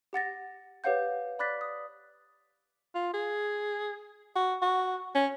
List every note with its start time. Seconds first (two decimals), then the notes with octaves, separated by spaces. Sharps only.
0.13 G4 F#5 A6 A#6
0.84 G4 B4 C#5 F5 F#5 G6
1.39 D5 B5 D6 F#6 A6 B6
1.61 D#6
2.95 F4
3.13 G#4
4.35 F#4
4.62 F#4
5.15 C#4